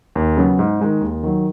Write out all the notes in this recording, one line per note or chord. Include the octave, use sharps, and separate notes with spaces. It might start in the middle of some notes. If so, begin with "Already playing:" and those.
D#2
C#3 F#3 B3
G#2
D#3 G#3 D#4
D#2
D#3 F#3